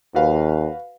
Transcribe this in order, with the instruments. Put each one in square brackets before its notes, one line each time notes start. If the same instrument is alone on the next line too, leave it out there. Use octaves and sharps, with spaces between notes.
[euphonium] D#2 [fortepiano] F#4 B4 F5